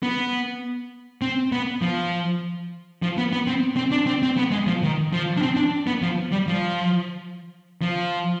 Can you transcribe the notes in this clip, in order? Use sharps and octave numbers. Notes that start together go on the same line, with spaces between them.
B3
C4
B3
F3
F3
B3
B3
C4
C4
D4
C4
C4
B3
G#3
F3
D#3
F3
D4
C4
D4
B3
F3
G3
F3
F3